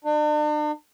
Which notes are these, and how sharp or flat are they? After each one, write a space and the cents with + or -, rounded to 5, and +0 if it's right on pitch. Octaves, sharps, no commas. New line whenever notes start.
D4 +45